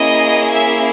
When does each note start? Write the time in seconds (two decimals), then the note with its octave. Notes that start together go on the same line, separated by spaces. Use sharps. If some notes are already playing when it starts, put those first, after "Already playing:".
Already playing: A#3 C#4 E4 G#4 D#5
0.51 E5